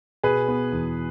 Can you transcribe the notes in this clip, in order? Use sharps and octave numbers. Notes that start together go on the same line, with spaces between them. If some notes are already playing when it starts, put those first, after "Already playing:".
B2 G#4 B4
B3
E2